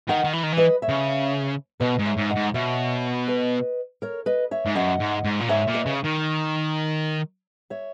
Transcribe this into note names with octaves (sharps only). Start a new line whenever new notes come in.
D#3 D#5 F#5
D#3
E3
D#3
E3
B4 D#5
C#5 E5
C#3
B2 B4 D#5
G#2
C#5 E5
G#2
D#5 F#5
G#2
B2 C#5 E5
B4 D#5
A#4 C#5
B4 D#5
C#5 E5
G#2
F#2 D#5 F#5
G#2
G#2
A#2
G#2 C#5 E5
A#2
B4 D#5
C#3
D#3
C#5 E5